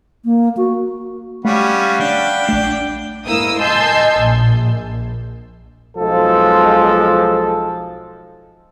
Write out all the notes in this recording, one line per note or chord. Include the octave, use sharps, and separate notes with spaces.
A#3
F#4
G3 A3 C#4 F5 F#5 B5
D4 G5
A#1 A3
G#2 A#3 E4 D#6 E6
D#5 G#5 A5 C6 E6 G6
A#1
B1 F3 G#3 A4